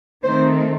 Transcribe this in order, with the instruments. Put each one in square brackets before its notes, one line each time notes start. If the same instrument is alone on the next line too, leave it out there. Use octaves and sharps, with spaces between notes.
[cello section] D#3 A3 C4 D#4 C5